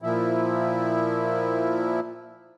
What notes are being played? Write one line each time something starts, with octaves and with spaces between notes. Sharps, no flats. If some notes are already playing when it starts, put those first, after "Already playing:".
A#2 F3 E4